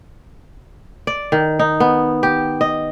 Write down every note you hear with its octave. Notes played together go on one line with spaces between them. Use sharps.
D5
D#3
D#4
B3
G4
D#5